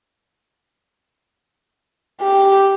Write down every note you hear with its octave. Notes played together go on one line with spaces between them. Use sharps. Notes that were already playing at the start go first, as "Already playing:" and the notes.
G4